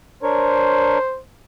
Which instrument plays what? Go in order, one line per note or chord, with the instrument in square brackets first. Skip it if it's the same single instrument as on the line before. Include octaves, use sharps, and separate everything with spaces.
[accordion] D4 A#4 C#5 [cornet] C5